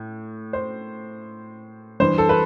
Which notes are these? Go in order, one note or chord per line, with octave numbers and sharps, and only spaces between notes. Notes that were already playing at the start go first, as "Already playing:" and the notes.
Already playing: A2
C5
G2 E3 C5
A4
B4